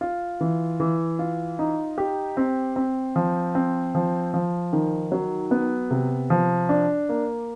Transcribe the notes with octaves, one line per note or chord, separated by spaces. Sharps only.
F4
E3
E3
F4
D#4
G4
C4
C4
F3
C4
F3
F3
D#3
F#3
B3
C3
F3
D4
A#3